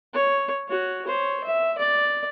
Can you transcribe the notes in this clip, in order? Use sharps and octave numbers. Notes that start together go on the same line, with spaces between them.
C#5
F#4 C#5
C5 C#5
E5
D5